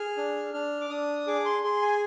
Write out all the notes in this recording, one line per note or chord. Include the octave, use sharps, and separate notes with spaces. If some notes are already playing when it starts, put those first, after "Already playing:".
Already playing: G#4 F6
D4
D4 F6
D6
D4 D#6
G#4 D6
C6
G#4 C6
G#5